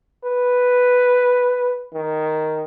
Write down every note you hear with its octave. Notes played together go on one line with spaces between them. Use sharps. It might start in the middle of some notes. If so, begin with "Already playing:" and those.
B4
D#3